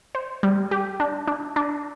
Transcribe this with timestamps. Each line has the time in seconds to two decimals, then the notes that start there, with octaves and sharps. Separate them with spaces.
0.15 C5
0.43 G3
0.71 G4
1.00 D4
1.27 D4
1.56 D4